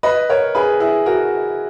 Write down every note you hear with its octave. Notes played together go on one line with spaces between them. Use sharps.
B4 D#5
A#4 C#5
G#4 B4
E4 G#4
F#4 A#4